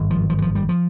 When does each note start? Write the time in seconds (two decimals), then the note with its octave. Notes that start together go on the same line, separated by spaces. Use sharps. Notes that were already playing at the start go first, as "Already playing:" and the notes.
Already playing: G#1 G2
0.10 F3
0.30 F3
0.38 E3
0.42 F3
0.55 G3
0.69 F3